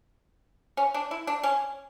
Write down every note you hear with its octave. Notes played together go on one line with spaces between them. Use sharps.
C#4
D4
E4
D4
C#4